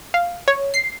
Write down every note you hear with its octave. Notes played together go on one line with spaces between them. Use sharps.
F5
C#5
C7